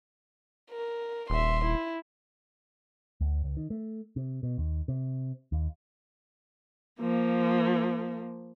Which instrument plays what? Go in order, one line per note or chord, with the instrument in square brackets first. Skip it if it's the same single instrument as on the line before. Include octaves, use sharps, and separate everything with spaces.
[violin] A#4
[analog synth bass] D#1 [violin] E5 C6
[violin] E4
[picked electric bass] D2
C#2
D#3
A3
C3
B2
D#2
C3
D#2
[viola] F3 A#3